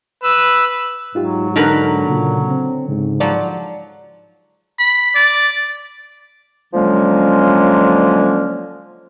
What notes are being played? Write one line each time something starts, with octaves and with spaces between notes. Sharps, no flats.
B4 E6
G#2 F#3 D#4 F4 G4
D3 D#4 A#4 B4
A#2 C#3
C4
G#2 C#3
F3 F#3 D5
B5
D5
D3 F3 F#3 G#3 A#3 C#4